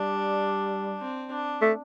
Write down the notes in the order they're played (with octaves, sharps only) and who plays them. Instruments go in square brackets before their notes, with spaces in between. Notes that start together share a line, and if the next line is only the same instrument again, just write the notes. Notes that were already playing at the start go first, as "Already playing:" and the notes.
Already playing: [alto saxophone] G3 [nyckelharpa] D4
[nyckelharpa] C4
D4
[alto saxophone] A3